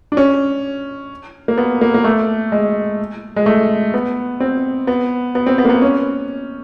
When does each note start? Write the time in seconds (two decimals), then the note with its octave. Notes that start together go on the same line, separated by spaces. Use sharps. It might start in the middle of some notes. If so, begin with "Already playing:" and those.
0.12 D4
0.17 C#4
1.48 A#3
1.58 B3
1.81 A#3
1.94 A#3
2.04 A3
2.52 G#3
3.36 G#3
3.46 A3
3.94 B3
4.40 C4
4.87 B3
5.35 B3
5.46 C4
5.58 B3
5.65 A#3
5.69 B3
5.82 C#4